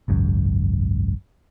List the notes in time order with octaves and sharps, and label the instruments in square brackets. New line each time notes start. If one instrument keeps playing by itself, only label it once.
[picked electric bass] G#1 C#2 F#2